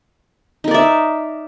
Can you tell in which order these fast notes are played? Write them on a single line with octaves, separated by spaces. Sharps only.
D#4 A#4 D5 E5